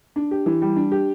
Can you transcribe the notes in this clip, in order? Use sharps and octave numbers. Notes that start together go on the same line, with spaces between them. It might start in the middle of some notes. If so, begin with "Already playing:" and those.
D4
G4
E3
G3
D4
G4